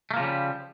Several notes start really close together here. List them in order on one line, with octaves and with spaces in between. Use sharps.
A3 A#3 F3 C#3 G3